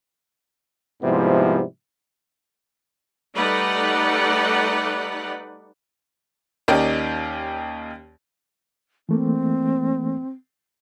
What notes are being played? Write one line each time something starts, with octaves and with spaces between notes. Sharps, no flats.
G#2 C3 F3 G3 B3 E4
G3 A3 D#4 B4 D5 F#5
D#2 C#4 D#4 G4 A#4 D5
E3 A3 A#3 C4